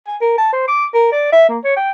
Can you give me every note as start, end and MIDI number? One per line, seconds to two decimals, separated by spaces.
0.07 0.16 80
0.21 0.33 70
0.38 0.48 81
0.53 0.63 72
0.68 0.86 86
0.94 1.09 70
1.12 1.28 74
1.32 1.48 76
1.49 1.58 58
1.64 1.75 73
1.76 1.91 79